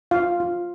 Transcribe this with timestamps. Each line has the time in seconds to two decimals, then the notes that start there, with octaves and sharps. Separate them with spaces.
0.11 F4 F5
0.40 F4